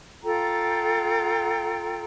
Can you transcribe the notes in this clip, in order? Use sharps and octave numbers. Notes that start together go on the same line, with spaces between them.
F4 A4 G5 A#5